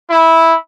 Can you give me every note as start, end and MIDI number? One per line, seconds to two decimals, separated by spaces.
0.10 0.54 64